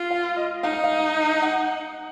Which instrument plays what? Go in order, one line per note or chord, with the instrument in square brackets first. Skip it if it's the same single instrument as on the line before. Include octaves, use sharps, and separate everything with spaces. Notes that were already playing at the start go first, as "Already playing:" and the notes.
Already playing: [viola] F4
[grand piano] F5
D#5
[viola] D#4 [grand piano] F5
[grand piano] D#5
F5
F#5